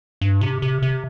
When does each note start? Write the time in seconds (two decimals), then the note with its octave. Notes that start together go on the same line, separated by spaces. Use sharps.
0.21 G2
0.41 C3
0.62 C3
0.82 C3